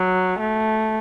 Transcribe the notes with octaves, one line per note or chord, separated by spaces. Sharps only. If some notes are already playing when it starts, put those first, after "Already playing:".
Already playing: F#3
A3